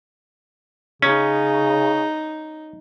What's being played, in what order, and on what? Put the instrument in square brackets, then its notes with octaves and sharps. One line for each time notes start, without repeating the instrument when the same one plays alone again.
[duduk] C#3 [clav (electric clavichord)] C#4 [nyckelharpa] D#4